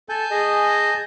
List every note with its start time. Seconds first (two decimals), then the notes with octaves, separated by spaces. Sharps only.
0.09 A4 G#5 A5 G6
0.31 G#4 D#5